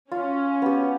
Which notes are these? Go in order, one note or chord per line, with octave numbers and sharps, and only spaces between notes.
C#4 F4
B3 G4